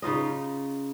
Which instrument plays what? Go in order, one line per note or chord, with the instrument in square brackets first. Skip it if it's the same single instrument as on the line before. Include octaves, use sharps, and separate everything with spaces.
[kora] C#3 D#4 F4 D#5